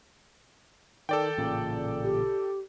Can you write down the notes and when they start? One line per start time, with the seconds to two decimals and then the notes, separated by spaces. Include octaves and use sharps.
1.09 D#3 A4 D5 G5
1.38 A1 A#2 C#3
2.03 G4